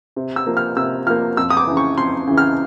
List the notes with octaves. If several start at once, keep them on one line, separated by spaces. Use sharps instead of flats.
C3
E6
F3 A#3
F6
C3 E6
F3 A#3 F6
F2 E6
D#6
D6
C#3 E3
C#6
F2 C6
C#3 E3
F6